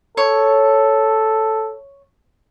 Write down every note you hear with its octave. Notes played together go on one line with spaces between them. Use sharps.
A4 C#5